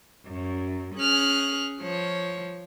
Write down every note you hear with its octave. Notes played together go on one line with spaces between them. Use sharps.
F#2
C#4 G#4 F6 F#6
F3 C#5